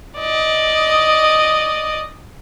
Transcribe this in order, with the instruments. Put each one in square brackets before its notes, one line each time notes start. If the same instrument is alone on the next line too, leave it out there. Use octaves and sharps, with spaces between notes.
[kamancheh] D5 D#5